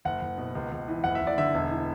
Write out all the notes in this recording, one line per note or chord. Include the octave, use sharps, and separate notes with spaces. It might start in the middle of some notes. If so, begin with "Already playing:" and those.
F#1 F#5
F#1
B2
C#2
C#2
E3
F#1 F#5
E5
F#1
D5
D3 E5
E1
E3